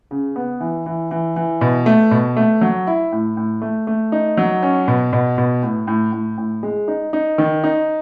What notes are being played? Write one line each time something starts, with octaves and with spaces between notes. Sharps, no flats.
C#3
B3
E3
E3
E3
E3
B2
A3
B2
A3
F#3
E4
A2
A2
A3
A3
D#4
F#3
C#4
B2
B2
B2
A2
A2
A2
A2
G#3
D#4
D#4
D#3
D#4